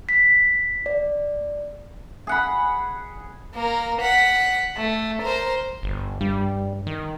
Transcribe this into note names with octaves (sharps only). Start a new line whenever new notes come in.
B6
D5
G#4 F#5 B5
A#3 A#4
F#5 B6
A3
A#4 C5
G1
G2 G3
D#3